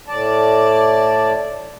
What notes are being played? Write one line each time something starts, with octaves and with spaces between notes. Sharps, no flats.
A2 D5 A5